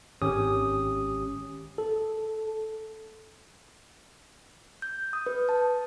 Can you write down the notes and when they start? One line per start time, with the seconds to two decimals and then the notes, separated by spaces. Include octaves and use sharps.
0.22 G#1 C#4 G4 D#6
1.78 A4
4.82 G6
5.13 D#6
5.26 B4
5.49 A5